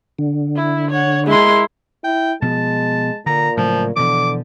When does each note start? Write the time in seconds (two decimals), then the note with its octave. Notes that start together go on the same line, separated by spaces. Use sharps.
0.19 D3
0.56 E4
0.91 C#5 F#5
1.27 G#3 E4 A#4 C6
2.04 E4 G5
2.42 B2 F3 G#3 B3 A5
3.26 A#2 D3 A#5
3.57 A2 C#3 F3 F#3
3.96 B2 D3 E3 F3 D6